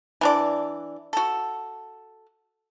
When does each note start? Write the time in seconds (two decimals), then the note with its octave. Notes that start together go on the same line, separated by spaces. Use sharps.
0.21 E3 D4 D5
1.13 F#4 A4